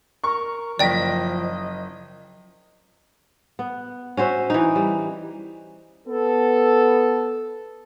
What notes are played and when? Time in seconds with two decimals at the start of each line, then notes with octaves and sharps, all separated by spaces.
0.24 A#4 C#6
0.79 F#1 F3 D5 D#5 G5 A#6 B6
3.59 B3
4.17 C#4 F#4 C5 E5
4.50 E3 D#4
4.76 G3
6.08 B3 A4